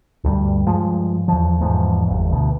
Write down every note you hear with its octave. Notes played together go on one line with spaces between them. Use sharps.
D2 G2 G3
G2 F3 G#3
E2 F3
E1 E2 G#2 F3
G1 E2
D2 B2